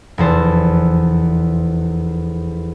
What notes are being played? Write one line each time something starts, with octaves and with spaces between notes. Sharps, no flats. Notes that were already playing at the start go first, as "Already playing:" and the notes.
F1 E2 C5 A5